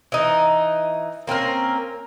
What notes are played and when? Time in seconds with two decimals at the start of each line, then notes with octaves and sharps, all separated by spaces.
0.12 E3 D#4
1.27 A#3 C4 C#4 A#4